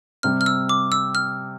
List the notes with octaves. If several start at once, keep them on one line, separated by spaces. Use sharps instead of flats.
C3 G3 C4 F6
F6
E6
D6
E6
F6